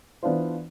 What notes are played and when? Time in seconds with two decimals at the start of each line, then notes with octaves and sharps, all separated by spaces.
0.23 E3 B3 D4 F4 C5